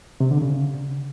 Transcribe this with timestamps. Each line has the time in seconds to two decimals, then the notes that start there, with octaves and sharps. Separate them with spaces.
0.20 C3
0.31 D3
0.42 C#3